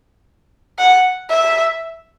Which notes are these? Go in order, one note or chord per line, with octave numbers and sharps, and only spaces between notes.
F#5
E5